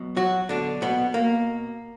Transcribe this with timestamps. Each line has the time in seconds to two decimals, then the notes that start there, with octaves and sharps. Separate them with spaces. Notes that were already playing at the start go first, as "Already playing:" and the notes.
Already playing: B1 B2
0.17 F#3 F#4
0.49 B1 B2 D3 D4
0.82 B2 B3
1.14 B2 A#3